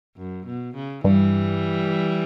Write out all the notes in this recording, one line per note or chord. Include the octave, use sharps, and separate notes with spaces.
F#2
B2
C#3
G2 E3 G3